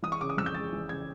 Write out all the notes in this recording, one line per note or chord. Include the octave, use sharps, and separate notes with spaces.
E3 D#6
C#6
C#3 D6
D#6
F2 E6
G6
G#3 A6
E3
C#3 G#6